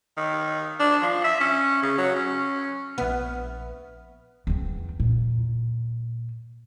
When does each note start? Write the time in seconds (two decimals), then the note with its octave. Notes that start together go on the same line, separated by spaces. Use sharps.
0.17 D#3
0.80 D4
1.02 F3
1.24 E5
1.40 C#4
1.82 C#3
1.98 F#3
2.16 C#4
2.98 A#1 B3 E5 F6
4.47 E2 C4
5.00 A#2